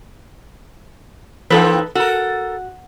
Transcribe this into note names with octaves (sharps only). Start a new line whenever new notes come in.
E3 A#3 C4 D#4 A4 B4
F#4 A4 A#4